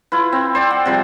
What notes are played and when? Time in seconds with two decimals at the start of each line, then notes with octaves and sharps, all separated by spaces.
0.12 E4 F4 B4
0.32 C4
0.55 C5 D5 G5
0.71 F#5
0.86 C3 F3 G3